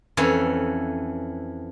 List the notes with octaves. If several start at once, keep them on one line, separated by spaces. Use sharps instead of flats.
F2 E3 C#4